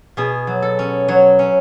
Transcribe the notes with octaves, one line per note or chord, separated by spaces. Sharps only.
B2 G#4
F#3
A4
C#4
F#3 C#5
C#4